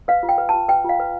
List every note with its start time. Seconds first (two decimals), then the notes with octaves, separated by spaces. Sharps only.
0.08 B4 F5
0.23 F4
0.29 G5
0.38 B4
0.49 F4 A5
0.68 B4 G5
0.84 F4 F5
1.00 B4